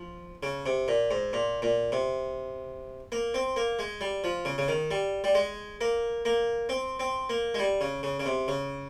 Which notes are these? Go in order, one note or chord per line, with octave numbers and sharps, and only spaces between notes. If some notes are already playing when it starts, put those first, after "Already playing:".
Already playing: F3
C#3
C3
A#2
G#2
A#2
A#2
C3
A#3
C4
A#3
G#3
G3
F3
C#3
C#3
D#3
G3
G3
G#3
A#3
A#3
C4
C4
A#3
G#3
G3
C#3
C#3
C#3
C3
C#3